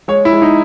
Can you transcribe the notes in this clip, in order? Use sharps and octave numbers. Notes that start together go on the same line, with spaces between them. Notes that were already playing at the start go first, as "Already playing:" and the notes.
G#3 C#5
E4
G#3
D#4